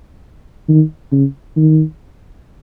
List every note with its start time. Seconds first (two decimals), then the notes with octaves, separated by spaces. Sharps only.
0.69 D#3
1.12 C#3
1.57 D#3